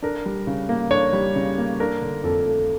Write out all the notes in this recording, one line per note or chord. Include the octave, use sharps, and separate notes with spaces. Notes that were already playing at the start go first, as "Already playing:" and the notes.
D4 A#4
G3
C#3
A#3
D4 C#5
G3
C#3
A#3
D4 A#4
D3
F2 A4
A3